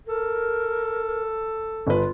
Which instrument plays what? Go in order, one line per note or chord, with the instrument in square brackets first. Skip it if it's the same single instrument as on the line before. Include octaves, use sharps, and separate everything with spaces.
[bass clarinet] A4 [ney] A#4
[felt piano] G1 B4 [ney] F4